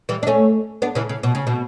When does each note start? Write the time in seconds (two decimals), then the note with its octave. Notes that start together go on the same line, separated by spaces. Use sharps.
0.09 E3 G3
0.23 D4
0.27 A3 C#4
0.82 B3 D4
0.95 C#3 E3
1.09 C#3
1.23 B2
1.35 C#3
1.47 B2